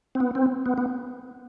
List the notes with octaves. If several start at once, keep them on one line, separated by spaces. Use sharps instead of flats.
C4
B3
C4
B3
B3